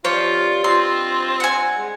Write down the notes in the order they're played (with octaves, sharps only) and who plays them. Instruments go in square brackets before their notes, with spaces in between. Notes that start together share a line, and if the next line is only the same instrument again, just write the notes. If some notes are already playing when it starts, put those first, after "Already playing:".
[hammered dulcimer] C3 D#3 G3 [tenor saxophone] F3 [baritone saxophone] F4 [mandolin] C#5
[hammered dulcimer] G2 C3 D5
[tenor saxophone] C4 [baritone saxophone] F4 [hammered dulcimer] D#5 G5 C#6 [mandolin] C6
[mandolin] F#5 G#5
[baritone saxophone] G#3